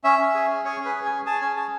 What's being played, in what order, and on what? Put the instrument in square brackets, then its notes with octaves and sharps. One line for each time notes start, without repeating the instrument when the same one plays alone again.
[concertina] C#4 E5
C#4
G#4
C#4
G#4 C#5
C#4
B4
G#4
G#5
G#4
G#4 A5
C#4 G#5
G#4 A5